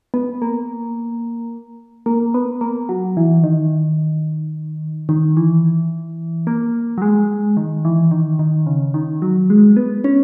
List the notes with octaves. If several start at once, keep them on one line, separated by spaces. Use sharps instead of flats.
B3
A#3
A#3
B3
A#3
F#3
E3
D#3
D#3
E3
A#3
F#3
G#3
D#3
E3
D#3
D#3
C#3
D#3
F#3
G#3
B3
C#4